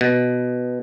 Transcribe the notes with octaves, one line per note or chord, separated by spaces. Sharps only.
B2